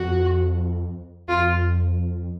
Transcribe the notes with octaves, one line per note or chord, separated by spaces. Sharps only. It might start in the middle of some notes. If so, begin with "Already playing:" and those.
Already playing: F2 F#4
F2 F4